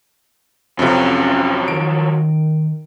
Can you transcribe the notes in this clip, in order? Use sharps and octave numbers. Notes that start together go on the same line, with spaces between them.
F2 C3 F3 F#3 C#4
D#3 D7